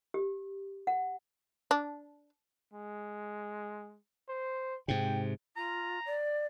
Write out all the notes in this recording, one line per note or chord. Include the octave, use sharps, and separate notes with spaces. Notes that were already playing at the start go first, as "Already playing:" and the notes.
G4
F#5
D4
G#3
C5
G#2 C3 G5
F4 A#5
D5